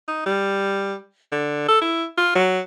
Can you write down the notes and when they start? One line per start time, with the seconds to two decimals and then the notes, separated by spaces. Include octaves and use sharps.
0.08 D#4
0.26 G3
1.32 D3
1.68 A4
1.82 E4
2.18 F4
2.35 F#3